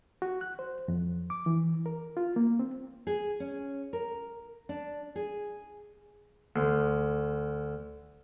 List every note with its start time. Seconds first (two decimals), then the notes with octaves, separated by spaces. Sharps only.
0.22 F#4
0.41 F#6
0.59 C5
0.88 F2
1.30 D6
1.46 E3
1.86 A#4
2.17 F4
2.36 A#3
2.59 C4
3.07 G#4
3.40 C#4
3.93 A#4
4.69 D4
5.15 G#4
6.56 D2 C6